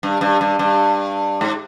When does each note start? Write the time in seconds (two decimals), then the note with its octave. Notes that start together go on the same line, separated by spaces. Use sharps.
0.03 G2
0.21 G2
0.41 G2
0.59 G2
1.41 G#2